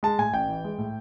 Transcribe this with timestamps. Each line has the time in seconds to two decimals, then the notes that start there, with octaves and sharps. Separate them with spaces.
0.03 G#3 A5
0.18 A2 G#5
0.33 A1 G5
0.49 E3
0.64 G#3
0.78 A2